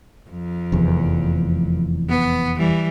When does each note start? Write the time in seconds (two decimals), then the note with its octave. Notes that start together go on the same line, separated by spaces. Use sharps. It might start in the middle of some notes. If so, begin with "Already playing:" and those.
0.29 F2
0.72 F1 E2
2.09 B3
2.58 E3 G3